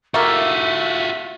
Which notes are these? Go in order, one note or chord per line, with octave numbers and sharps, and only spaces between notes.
A3 A#3 F4 F#4 E5